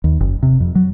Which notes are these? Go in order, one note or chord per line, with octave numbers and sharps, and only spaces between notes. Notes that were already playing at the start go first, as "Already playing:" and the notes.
D#2
F#1
C3
F2
F#3